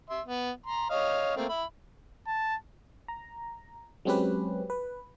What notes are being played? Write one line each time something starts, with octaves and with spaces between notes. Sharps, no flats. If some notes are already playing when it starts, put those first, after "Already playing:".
E5 C6
B3
A#5 C6
C#5 D#5 F5
A3 A#3 C4
E5 B5
A5
A#5
F#3 G#3 C4 C#4 G4 B4
B4